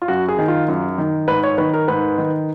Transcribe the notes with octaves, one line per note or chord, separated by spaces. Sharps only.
F4
F#2 F#4
G#4
D#3
F4
F#2 F4
D#3
G#2 B4
C#5
D#3 B4
A#4
G#2 B4
D#3